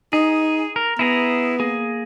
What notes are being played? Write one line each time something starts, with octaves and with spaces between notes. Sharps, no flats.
D#4 G#4
A#4
B3 E4 G#4 A#5
A#3 G#4